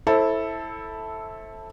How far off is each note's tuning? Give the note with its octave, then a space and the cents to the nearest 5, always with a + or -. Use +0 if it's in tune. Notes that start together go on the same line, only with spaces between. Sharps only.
E4 -10 A4 +0 C5 +30